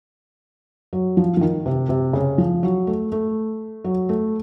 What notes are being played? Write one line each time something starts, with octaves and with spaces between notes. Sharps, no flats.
F#3
F3
F3
D#3
C3
C3
C#3
F3
F#3
A3
A3
F#3
A3